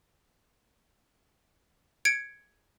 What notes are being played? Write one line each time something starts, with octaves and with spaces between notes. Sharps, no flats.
G#6 C#7 D7